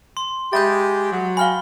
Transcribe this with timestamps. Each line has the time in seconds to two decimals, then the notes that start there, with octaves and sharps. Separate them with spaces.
0.17 C6
0.53 G#3 G4 E5 B5 G6 A6
1.12 F#3
1.37 F5 G5 G#5 B5 F6 G7